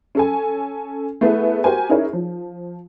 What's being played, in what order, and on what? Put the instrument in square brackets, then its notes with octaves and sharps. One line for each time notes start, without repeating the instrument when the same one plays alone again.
[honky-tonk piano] C#4 A4 G#5
A3 B3 E4 G#4
F#4 G4 A#4 C5 G#5
C#4 D#4 E4 G#4 A#4 C#5
F3